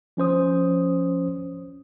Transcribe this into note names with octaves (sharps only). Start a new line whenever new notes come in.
F3 C#4 C5 D#6